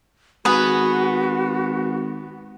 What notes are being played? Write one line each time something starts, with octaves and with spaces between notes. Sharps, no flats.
G#1 B3 F#4 G#4 B4